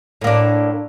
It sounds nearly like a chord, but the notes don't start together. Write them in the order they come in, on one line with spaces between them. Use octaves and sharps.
A2 A#3 D4